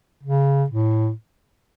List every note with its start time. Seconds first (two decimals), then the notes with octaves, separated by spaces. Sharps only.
0.23 C#3
0.70 A2